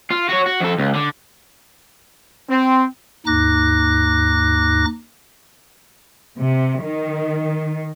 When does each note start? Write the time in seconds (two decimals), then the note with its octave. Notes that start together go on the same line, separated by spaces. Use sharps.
0.11 F4
0.29 F#4 C#5
0.47 F#4
0.61 F2 A4
0.78 C#2
0.95 D3
2.49 C4
3.27 D#2 G#2 D#4 D6 F#6 A#6
6.39 C3
6.84 D#3